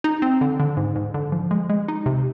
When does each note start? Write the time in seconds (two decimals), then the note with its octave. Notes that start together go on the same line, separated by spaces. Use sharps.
0.04 D#4
0.22 C4
0.41 D3
0.60 D3
0.77 G#2
0.96 G#2
1.14 D3
1.32 F3
1.51 G#3
1.69 G#3
1.88 D#4
2.06 C3